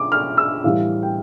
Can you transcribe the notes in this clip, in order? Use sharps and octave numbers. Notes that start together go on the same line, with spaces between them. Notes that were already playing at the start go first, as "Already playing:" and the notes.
Already playing: D6
F6
E6
A2 E3 G3 F5
G5